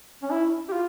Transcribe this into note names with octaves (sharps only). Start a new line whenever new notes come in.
C#4
E4
G4
F4